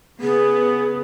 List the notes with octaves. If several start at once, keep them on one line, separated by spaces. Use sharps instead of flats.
C#3 B3 G#4